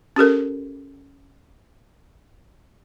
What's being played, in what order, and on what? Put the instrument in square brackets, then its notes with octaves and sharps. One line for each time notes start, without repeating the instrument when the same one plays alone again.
[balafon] C#4 G4 A4 A#4